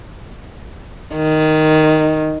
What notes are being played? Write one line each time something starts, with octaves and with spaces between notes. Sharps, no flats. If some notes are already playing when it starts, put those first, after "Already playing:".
D#3